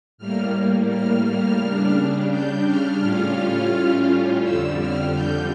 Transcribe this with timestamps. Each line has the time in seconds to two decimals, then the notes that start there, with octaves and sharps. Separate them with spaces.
0.18 A2 G3 A#3 F6
0.88 F6
1.24 F6
1.59 C#3 G3 D4
2.30 G6
2.66 F6
3.00 A2 G3 C#4 F4
4.42 F2 D3 G3 E6
4.78 F6
5.13 G6